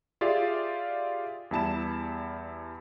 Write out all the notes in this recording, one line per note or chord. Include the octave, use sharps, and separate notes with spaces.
F4 G4 G#4 D5 E5 F5
E2 G3 E4 A5 B5 E7